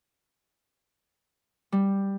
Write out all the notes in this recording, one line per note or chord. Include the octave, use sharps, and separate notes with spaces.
G3